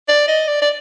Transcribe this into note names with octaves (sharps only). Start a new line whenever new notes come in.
D5
D#5
D5
D5